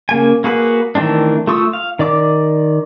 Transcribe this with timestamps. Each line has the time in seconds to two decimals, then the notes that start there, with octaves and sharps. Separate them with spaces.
0.09 C#3 A#3 G#5
0.44 A#3 F#4 G#4 B4
0.95 D#3 E3 A3 C4 D4
1.47 A3 F4 C#6 D#6 E6
1.73 F5
1.99 D#3 D5 D6